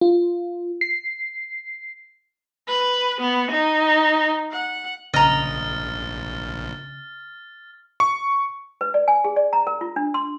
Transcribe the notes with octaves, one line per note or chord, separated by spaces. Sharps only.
F4
C7
B4
B3
D#4
F#5
A#1 C#3 D#5 A#5 F6 A6
C#6
B4
D5
G#5
G#4
D5
A#5
A#4
F4
D4
C6